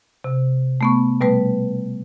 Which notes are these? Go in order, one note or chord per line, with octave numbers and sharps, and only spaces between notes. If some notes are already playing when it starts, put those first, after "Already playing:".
C3
A3 B3 C#6
B2 G3 A3 B4